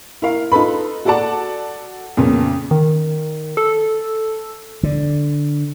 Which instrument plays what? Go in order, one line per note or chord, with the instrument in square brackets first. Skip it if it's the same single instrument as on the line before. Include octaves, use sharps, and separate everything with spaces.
[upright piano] E4 A#4 F5
D#4 F4 A4 B4 B5
F#4 A4 D5 F#5 A5
F2 A#2 C#3 B3 C#4
[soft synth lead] D#3
A4
[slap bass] D3